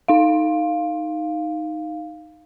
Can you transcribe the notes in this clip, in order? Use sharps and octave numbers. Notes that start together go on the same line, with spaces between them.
D#4 F5